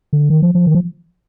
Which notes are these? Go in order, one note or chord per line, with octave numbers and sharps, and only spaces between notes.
D3
D#3
F3
F3
D#3
F3